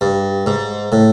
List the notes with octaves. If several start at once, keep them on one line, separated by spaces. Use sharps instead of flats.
G2
G#2
A2